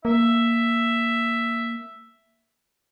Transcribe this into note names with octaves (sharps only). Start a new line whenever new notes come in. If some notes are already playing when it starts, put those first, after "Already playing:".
A#3 E5